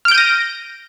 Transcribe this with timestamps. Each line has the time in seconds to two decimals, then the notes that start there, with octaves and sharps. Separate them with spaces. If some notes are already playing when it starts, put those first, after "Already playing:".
0.05 F6
0.08 D7
0.11 G6
0.15 D#7
0.18 A#6